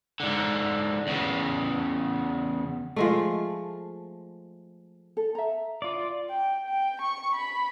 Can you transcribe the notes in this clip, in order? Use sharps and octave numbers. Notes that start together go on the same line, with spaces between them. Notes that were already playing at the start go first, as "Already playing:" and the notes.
G#2 D3
E2 C#3
F3 G#3 A3
A4
E5 A#5
F4 D5
G5
G5
C#6
B5